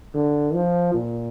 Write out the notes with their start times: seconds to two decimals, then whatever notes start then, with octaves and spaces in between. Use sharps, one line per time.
0.14 D3
0.54 F3
0.94 A#2